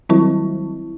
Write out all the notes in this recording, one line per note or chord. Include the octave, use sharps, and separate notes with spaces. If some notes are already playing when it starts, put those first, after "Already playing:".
D#3 F#3 G3 C4 E4